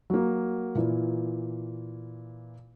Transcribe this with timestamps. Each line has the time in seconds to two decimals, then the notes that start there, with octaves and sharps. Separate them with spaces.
0.10 F#3 A#3
0.75 A#2 E3